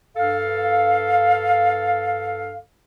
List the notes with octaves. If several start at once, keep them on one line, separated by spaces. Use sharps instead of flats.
G2 A4 F5